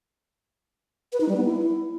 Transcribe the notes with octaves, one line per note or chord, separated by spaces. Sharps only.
B4
D#4
G3
B3
E4